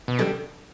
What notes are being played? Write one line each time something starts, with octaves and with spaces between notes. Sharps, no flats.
B2
D3 G3